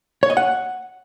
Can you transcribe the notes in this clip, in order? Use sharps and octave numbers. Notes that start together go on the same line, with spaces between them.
C#5
D#5
F#5